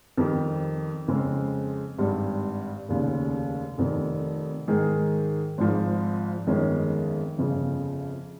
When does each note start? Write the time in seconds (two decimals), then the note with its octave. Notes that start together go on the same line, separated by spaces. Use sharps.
0.17 F2 D#3 G3 C4 G4
1.08 F2 C#3 G#3 C4
1.98 G#1 G2 G3
2.88 F1 D#2 C#3
3.78 F1 F2 D#3
4.68 G#2 D#3 G#3 D#4 G#4
5.58 G#1 G#2 F3
6.47 G1 F2 D#3 G#3 C#4
7.38 G1 F2 C#3 F3